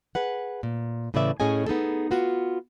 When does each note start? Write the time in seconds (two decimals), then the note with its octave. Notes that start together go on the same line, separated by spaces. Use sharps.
0.15 G#4 B4 F#5
0.63 A#2
1.14 A2 C#3 E3 B4 D5 E5
1.40 A2 C#4 G#4 D#5 G#5
1.67 B3 D#4 G#4 A4
2.11 B3 F4 F#4